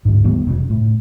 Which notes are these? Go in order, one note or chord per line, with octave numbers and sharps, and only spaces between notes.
D2 G#2
D#2 G3 G#3 B3
F1 A2 C#3
A2